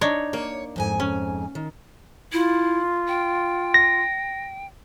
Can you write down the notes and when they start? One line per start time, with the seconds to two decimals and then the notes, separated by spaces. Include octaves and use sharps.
0.01 D4 D#4 C#5
0.33 A#3 C#5
0.76 F2 G#2 G#5
1.00 C#4
1.55 D#3
2.32 E4 F4
3.08 G5
3.74 A#6